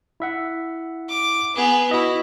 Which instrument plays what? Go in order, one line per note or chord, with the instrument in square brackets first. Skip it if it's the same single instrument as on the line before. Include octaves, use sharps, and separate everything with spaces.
[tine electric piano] E4 E5 F#5
[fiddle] D6
B3 G#4
[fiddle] E4 [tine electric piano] F#4 D#5